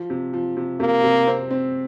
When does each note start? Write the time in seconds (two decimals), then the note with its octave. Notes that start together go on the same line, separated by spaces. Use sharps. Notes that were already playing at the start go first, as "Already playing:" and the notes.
Already playing: F3
0.10 C3
0.33 F3
0.57 C3
0.80 C3 A#3
1.04 C3
1.27 C4
1.51 C4